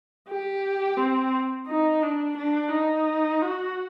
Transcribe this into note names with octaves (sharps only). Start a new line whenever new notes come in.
G4
C4
D#4
D4
D4
D#4
F#4